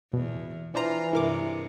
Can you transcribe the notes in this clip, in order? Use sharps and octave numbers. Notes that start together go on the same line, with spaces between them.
E2 B2
E3 D4 F4 C5 A#5
G2 C3 G#3 E4 A#4 D6